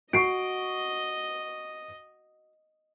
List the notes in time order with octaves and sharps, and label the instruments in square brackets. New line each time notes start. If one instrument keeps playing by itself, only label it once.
[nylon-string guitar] F#4 [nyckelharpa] D#5 [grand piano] C#6 C7 D7